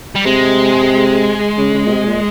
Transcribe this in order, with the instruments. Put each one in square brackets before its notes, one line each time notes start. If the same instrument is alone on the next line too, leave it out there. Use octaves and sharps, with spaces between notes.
[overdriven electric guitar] G3
[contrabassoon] C3 [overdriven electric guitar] G#3
[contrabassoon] C#3
C#3
A#2
C3
A#2